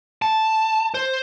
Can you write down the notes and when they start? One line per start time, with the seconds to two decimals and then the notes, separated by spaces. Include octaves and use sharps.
0.22 A5
0.94 C5